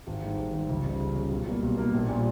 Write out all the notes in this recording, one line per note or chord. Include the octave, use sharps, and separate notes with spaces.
G#1
G#2 D#3 G3
G#1
G#2 D#3 G3
C#2
C#3 G3
C#2
C#3 G3
B1
B2 G3 A#3
B1
B2 G3 A#3
A#1
A#2 G3